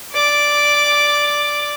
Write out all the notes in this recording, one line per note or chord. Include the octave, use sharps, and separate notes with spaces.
D5 D6